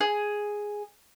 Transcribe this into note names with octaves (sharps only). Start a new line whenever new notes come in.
G#4